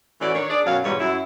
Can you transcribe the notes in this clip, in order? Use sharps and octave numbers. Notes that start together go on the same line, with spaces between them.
A2 E3 C#4 F#4 D5
D#3 D4 C#5
D4 G#4 D5
F#2 B2 F#3 F5
G#2 B2 E3 G3 C#5
F#2 E4